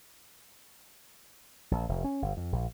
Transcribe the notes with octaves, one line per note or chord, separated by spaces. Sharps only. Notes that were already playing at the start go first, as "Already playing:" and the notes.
A#1
F1
C#4
G1
F2
A#1